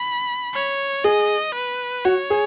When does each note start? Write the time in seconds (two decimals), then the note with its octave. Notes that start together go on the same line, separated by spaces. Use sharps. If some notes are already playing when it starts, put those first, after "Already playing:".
Already playing: B5
0.54 C#5
1.04 G#4 D#5
1.55 B4
2.05 F#4 C#5
2.30 G#4